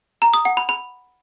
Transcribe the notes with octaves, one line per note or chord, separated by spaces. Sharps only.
A#5
D#6
F#5
B5
B5